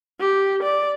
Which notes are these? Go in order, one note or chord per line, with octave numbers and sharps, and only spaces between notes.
G4
D5